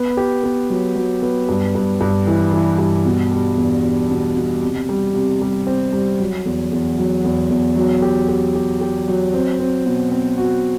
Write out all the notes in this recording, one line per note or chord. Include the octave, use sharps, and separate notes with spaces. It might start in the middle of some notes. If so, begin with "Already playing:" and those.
Already playing: B3
G4
B3
F#3
F#3
B3
G2
G2
G2
E3
E3
G2
B2
G3
E2
B2
B2
B2
C3
G3
C3
G3
C4
G3
F#3
E2
E2
F#3
E2
E2
F#3
G4
G4
G4
G4
F#3
C4
C4
B2
C4
F#4